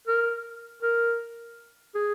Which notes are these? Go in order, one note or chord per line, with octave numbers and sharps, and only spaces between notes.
A#4
A#4
G#4